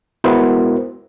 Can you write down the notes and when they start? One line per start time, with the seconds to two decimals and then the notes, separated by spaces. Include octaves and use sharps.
0.24 G#3 B3 E4 F#4 A#4 C5